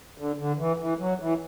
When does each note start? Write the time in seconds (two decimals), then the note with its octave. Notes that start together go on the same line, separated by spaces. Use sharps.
0.18 D3
0.38 D3
0.58 E3
0.80 E3
0.99 F#3
1.20 E3